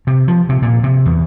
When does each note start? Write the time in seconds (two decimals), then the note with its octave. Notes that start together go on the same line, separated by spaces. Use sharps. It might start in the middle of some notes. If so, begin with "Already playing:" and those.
0.07 C3
0.28 F3
0.49 C3
0.62 A#2
0.83 C3
1.05 E2